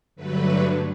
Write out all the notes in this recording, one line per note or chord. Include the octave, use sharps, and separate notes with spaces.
G2 D3 F#3 A3 B4